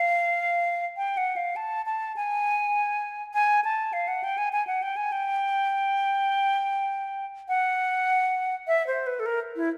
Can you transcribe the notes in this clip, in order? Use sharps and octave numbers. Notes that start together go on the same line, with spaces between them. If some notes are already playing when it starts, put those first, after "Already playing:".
Already playing: F5
G5
F#5
F5
A5
A5
G#5
G#5
A5
F5
F#5
G5
G#5
G#5
F#5
G5
G#5
G5
F#5
E5
C5
B4
A4
A#4
E4